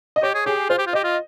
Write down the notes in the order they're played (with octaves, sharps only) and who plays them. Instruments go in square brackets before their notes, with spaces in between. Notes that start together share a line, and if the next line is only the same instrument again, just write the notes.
[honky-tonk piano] D#5
[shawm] G4 [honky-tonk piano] C#5
[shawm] G#4
[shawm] G4 [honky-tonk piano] G#4
[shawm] F4 [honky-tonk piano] C5
[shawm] G4
F4
[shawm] G4 [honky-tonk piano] D#5
[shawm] F4